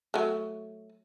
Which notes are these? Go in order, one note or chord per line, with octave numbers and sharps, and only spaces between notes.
F#3 A3